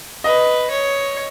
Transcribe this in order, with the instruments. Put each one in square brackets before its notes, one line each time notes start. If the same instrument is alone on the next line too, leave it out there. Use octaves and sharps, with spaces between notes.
[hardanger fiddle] B4 [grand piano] D#5
[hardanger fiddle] C#5